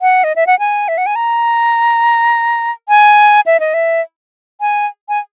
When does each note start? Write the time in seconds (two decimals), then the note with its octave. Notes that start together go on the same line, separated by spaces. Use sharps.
0.02 F#5
0.24 D#5
0.36 E5
0.47 F#5
0.59 G#5
0.88 E5
0.98 F#5
1.06 G#5
1.16 A#5
2.89 G#5
3.46 E5
3.60 D#5
3.74 E5
4.61 G#5
5.09 G#5